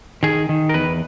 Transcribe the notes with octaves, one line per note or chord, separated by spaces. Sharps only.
D#3 G#4
D#3
A#4
E2 B4